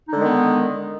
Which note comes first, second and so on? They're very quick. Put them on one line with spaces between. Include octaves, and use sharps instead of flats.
D#4 D3 G#3 D#3 B3